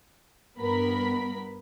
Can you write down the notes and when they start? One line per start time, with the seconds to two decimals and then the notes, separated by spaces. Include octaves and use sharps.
0.59 G2 B3 A#4 B5